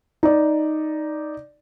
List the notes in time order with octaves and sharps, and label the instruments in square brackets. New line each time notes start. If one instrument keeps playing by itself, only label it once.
[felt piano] D#4 D5